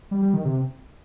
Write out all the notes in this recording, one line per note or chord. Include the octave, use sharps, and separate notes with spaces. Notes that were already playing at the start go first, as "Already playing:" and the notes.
G3
G3
D#3
C3